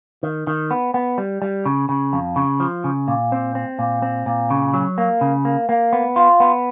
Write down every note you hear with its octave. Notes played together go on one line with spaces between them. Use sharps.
D#3
D#3
B3
B3
G3
G3
C#3
C#3
F2
C#3
F3
C#3
A#2
C4
C4
A#2
C4
A#2
C#3
F#3
A#3
C#3
A#3
A#3
B3
F4
B3